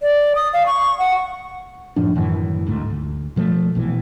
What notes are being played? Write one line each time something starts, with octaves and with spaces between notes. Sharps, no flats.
D5
D#6
F5
C#6
F#5
F#2 A2 F3 D4
F#2 A2 D#3 E3
D2 G#2 A3
D2
B2 F3 F#3 A3
A#1 B2 E3